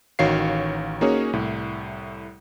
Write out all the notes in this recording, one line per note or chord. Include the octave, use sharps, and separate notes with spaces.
A1 D#3 F#4 C#5 F5 C7
A#3 C#4 D#4 F#4 G#4 C#5
C2 A2